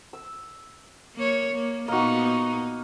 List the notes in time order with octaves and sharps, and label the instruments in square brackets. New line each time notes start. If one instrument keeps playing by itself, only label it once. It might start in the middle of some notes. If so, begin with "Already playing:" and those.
[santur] E6
[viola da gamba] A#3 C#5
A#3
[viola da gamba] A#2 B3 D#4 [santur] A#3 F#4